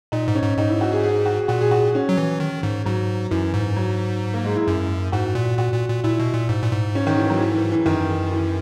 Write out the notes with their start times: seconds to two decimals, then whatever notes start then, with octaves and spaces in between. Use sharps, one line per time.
0.12 A#2 D#4
0.28 G#2
0.35 C#4
0.43 G#2
0.57 G#2 D#4
0.69 E4
0.81 F#4
0.92 G#4
1.03 G#4
1.25 F#4
1.48 A#2 F#4
1.61 G#4
1.71 F#4
1.95 C#4
2.09 F#3
2.17 E3
2.40 D#3
2.63 G#2
2.86 G#2 F#3
3.31 F#2 E3
3.54 G#2
3.76 F#3
4.34 A#3
4.44 G#3
4.56 E4
4.67 F#2
5.12 G#2 F#4
5.35 A#2
5.58 A#2 F#4
5.74 A#2
5.89 A#2
6.04 A#2 E4
6.20 B2
6.34 A#2
6.49 G#2
6.63 A#2
6.72 G#2
6.95 C#4
7.07 D#3
7.18 E3
7.30 F#3
7.40 E3
7.56 E3
7.71 E3
7.86 F#2 D#3
8.32 E3